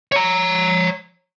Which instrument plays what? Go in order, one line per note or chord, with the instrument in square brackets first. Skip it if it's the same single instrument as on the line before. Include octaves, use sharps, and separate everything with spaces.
[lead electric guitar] C#5 A#5